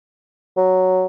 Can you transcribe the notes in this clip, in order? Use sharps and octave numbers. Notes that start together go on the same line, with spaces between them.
F#3